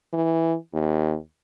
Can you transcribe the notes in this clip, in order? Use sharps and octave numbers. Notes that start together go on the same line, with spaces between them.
E3
D#2